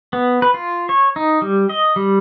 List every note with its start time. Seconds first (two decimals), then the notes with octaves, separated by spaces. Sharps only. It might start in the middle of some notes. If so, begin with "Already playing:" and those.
0.13 B3
0.42 B4
0.54 F4
0.89 C#5
1.16 D#4
1.42 G3
1.69 D#5
1.96 G3